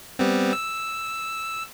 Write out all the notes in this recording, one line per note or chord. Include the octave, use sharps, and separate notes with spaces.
G3 B3 C4
E6